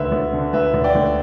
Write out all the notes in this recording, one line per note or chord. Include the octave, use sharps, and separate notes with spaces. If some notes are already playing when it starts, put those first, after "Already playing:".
Already playing: D2 B4 E5
D2
D3
D2 B4 E5
D2
D5 G5
D2